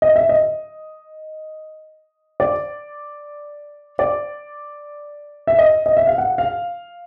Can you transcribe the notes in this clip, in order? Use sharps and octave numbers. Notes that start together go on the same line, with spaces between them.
D#5
E5
D#5
D5
D5
E5
D#5
D#5
E5
F5
F#5
F5